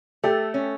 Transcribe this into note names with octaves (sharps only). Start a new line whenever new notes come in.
A3 G4 A4
C#4